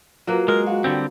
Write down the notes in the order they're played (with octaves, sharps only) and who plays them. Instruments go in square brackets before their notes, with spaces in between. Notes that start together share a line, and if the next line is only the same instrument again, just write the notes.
[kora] F#3 A#3 [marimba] F4 F#4 B4
[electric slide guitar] G#3 [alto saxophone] A#4
[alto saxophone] F#4 [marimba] F5
[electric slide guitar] D3 G3 C4